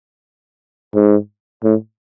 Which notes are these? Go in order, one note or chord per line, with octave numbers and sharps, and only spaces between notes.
G#2
A2